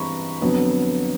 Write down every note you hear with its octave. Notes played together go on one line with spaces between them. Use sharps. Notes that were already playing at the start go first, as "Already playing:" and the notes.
Already playing: G2 E3 G#3 C4 A#5 B5 C#6
F2 D3 F#3 B3